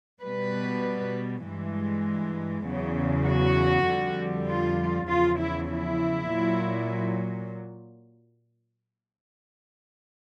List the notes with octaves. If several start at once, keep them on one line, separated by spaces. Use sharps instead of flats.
B2 G3 B4
G2 E3 G#3
E2 C#3 F#3
F#4
F2 D3 G3
F4
E2 C#3 F3 F4
E4
E4
A#2 F#3